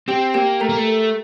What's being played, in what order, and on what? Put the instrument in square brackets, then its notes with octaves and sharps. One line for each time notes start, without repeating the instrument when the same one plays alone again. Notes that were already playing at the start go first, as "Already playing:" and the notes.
[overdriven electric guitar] C4 [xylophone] G4 G5
[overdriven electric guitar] A#3 [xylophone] G4 G5
[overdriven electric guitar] A3 [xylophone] A#4 A#5
[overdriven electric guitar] A#3
A3